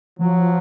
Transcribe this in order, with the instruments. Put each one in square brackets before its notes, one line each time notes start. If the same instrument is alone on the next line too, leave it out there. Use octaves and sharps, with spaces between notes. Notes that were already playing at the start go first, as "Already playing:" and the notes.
[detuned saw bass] F3 [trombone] F#3